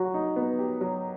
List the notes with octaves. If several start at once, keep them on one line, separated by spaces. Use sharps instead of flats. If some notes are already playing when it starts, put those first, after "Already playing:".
Already playing: F#3 F#4
D#4
B3
G4
F#3